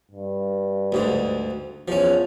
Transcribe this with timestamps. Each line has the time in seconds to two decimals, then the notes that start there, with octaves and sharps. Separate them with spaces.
0.11 G2
0.92 D2 G#2 D3
1.88 E2 F3 C#4